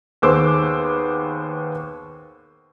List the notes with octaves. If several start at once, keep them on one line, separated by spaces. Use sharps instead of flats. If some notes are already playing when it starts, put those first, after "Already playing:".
D#2 B3 G#4 C5 D6 E6